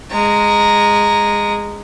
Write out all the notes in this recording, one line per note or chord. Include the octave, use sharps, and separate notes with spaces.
G#3 A#5